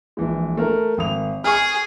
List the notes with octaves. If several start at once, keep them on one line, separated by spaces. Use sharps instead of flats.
A#1 E3 G#3
A3 A#4
G#1 D#6 F7
G#4 C#6 F6